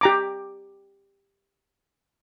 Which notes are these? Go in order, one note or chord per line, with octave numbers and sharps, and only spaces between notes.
G4 A#5 D6